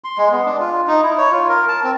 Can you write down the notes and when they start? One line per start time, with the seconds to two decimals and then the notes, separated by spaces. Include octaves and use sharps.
0.04 C6
0.18 G#3
0.32 B3
0.46 D4
0.60 F4
0.87 D#4
1.03 E4
1.18 C#5
1.31 F4
1.49 A#4
1.68 A5
1.84 C4